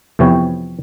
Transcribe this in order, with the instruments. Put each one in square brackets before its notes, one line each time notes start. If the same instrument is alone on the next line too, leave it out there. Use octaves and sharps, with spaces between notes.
[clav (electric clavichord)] F2 C3 E3 B3 C#5 G5